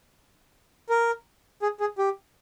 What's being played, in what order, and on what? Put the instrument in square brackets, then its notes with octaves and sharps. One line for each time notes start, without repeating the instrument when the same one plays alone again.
[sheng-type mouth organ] A#4
G#4
G#4
G4